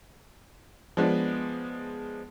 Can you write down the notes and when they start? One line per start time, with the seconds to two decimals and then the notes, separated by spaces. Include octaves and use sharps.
0.97 F3 G#3 B3 D4